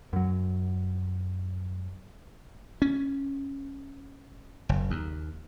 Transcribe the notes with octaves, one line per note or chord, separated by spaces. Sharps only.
F#2 F#3
C#4
F#1
D#2